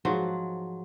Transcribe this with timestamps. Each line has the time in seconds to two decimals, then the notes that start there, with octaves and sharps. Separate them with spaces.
0.05 G#2 F3 F#3